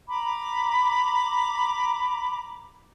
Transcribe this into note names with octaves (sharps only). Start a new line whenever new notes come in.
A#5 B5 D6